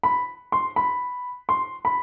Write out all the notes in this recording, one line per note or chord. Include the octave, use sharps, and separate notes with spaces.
B5
C6
B5
C6
B5